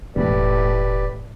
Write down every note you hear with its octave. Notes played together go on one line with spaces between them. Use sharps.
E1 A2 G4 B4 D5